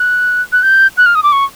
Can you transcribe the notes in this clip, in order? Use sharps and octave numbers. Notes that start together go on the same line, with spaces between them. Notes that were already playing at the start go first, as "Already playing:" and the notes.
Already playing: F#6
F#6
G6
F#6
F6
D#6
D6
C#6